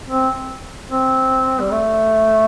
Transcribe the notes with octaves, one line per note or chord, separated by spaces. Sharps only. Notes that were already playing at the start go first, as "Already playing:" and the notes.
C4
C4
G3
A3